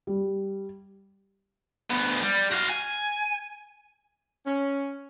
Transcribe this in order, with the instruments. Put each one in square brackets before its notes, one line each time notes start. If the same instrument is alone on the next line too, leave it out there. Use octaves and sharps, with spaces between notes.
[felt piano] G3
[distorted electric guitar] D2 B3
G3
F#4 F5
G#5
[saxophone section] C#4